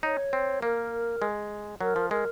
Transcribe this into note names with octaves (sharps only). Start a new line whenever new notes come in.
D#4 C#5
C4
A#3 A#4
G#3
F#3 A#4
F3
G#3 A#4